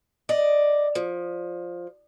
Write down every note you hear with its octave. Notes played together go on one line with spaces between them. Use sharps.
D5 D#5
F3